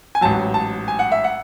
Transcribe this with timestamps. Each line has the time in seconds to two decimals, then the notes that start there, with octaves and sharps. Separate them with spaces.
0.15 G#5
0.21 A1 G#2 F#3 A5
0.54 A5
0.88 G#5
0.99 F#5
1.12 E5
1.24 F#5